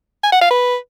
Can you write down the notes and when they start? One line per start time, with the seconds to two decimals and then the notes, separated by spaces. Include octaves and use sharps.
0.23 G#5
0.32 F#5
0.41 F5
0.50 B4